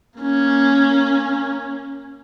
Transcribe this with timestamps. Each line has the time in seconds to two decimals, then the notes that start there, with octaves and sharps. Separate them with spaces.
0.19 A#3 C#4